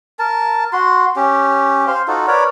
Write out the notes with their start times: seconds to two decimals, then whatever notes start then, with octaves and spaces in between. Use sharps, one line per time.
0.19 A#4 A5
0.73 F#4 C6
1.16 C#4 G4
1.87 C5 F5
2.08 D#4 F4 F#4 A4
2.27 A#4 B4 C#5 D5